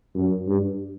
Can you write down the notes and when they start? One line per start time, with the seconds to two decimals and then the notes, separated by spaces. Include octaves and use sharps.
0.15 F#2
0.47 G2